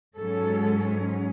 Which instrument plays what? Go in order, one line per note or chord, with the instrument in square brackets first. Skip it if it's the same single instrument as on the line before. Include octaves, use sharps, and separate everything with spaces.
[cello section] G#2 F#3 C#4 A4